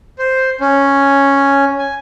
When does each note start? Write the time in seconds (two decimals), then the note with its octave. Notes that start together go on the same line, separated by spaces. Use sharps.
0.19 C5
0.61 C#4
1.79 G#5